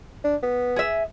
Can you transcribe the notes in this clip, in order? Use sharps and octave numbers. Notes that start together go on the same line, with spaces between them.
D4
B3
G#4 E5